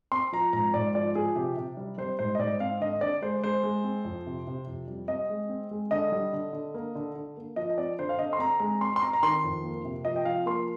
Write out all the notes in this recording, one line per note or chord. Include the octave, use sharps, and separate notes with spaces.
C4 C6
F3 A#5
G#2 A#5
G#2 D5
F3 D5
F3 G#4
C3 G4
C3
G3
G3 C5
G#2 C5
D#5
G#2 D5
C4 F5
D3 D#5
D3 D5
G#3 C5
G#3 C5
G#3
C4
F2
C3
C3
F2
G3
C4 D#5
G#3
C4
G#3
D3 D#5
G3
D3
D3
A#3
D3
D3
A#3
F3 D#5
D#5
C4 D5
D3 C5
F5
D3 D#5
C6
C4 A#5
G#3 A#5
C4 C6
C6
C4 A#5
A#5
D#3 C6
F2
A#3
C3
F3 D#5
G5
F3 F5
A#3 C6